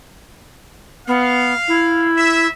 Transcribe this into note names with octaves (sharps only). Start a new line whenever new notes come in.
B3 F5
E4
E5